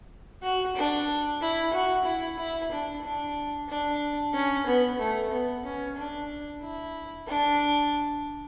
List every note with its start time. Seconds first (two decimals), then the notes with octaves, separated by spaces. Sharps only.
0.42 F#4
0.76 D4
1.41 E4
1.73 F#4
2.05 E4
2.38 E4
2.71 D4
3.03 D4
3.69 D4
4.33 C#4
4.66 B3
4.98 A3
5.31 B3
5.64 C#4
5.97 D4
6.62 E4
7.27 D4